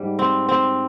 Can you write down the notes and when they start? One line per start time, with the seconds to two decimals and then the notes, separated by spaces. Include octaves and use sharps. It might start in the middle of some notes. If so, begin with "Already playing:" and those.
Already playing: G#2 G3
0.19 C4
0.49 C4